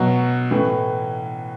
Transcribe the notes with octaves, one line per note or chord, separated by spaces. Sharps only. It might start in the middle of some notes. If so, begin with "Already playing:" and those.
Already playing: B2 F#3 F#5
A2 E3